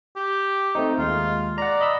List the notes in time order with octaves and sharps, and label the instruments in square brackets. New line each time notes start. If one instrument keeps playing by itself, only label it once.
[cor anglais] G4
[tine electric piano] A3 C4 D#4
[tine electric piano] D#2 G#3 [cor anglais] F4
[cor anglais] D5 [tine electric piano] F#5 A#5
[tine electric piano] D#5 B5 E6